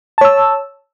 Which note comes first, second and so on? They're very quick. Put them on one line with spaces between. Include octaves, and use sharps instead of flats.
A5 C#5 E6